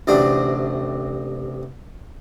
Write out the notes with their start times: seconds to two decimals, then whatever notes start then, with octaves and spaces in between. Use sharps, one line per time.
0.07 A1 D2 C3 D4